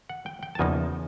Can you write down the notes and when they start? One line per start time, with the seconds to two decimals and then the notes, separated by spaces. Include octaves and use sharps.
0.09 F#5
0.26 G5
0.43 G5
0.55 A5
0.59 E2 C#3 F3 A#3 D#4 G#5